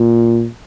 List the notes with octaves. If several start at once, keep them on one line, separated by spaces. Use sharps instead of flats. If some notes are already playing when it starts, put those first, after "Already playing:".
Already playing: A#2